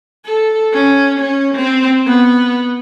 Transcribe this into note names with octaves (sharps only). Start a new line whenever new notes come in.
A4
C#4
C#4
C4
B3